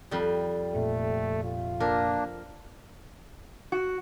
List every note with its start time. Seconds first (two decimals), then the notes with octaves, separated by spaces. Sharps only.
0.11 F2 G3
0.75 F1 A#2 A3
1.45 F4
1.80 F3 A#3 D4 A#4
3.72 F#4